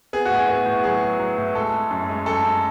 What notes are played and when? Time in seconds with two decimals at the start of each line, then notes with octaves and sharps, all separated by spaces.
0.13 B3 G#4
0.25 F#4
0.30 A2
0.37 G#4
0.49 B3 F#4
0.66 A2
0.84 F#3 G#4
1.02 F#3
1.19 F#3
1.38 A2
1.55 G#3 A4
1.74 G#3
1.90 F#2
2.09 G#3
2.26 F#2 A4
2.44 F#2